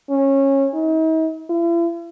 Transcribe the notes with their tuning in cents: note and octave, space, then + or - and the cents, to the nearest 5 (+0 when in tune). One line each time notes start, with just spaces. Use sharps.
C#4 -20
D#4 +45
E4 +45